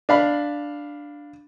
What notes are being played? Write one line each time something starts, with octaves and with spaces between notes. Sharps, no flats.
D4 F5 B5